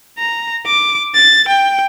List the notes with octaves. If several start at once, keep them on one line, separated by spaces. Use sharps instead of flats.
A#5
D6
A6
G5